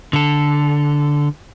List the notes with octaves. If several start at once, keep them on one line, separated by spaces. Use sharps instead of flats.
D3 A4